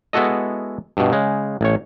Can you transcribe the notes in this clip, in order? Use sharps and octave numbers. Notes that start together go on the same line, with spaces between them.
G#3 B3 E4 F#4 A4 D#5
G2 B2
C#3 G#3
A1 C#5